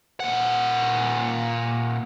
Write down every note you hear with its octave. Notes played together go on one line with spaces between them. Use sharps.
A#2 F#5